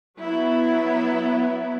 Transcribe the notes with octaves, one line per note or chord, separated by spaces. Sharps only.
F#3 B3 E4